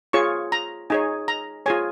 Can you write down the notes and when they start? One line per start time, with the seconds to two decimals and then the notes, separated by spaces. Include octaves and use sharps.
0.13 F4 G#4 C#5 C#6
0.52 A#5
0.90 D#4 G#4 C#5 G#5
1.28 A#5
1.66 F4 G#4 C#5 G#5